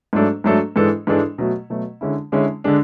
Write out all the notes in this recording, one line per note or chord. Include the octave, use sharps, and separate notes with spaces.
G#2 F#3 A3 D4 A4
G#2 F#3 A3 D4 A4
G#2 E3 G#3 D4 A4
G#2 E3 G#3 D4 A4
B2 F#3 A3
B2 F#3 A3
D3 G#3 C#4 E4
D3 G#3 C#4 E4
D3 G#3 D4